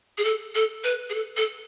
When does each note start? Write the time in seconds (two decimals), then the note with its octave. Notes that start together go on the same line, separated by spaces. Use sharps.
0.18 G#4
0.24 A4
0.55 A4
0.84 B4
1.10 G#4
1.14 A4
1.37 A4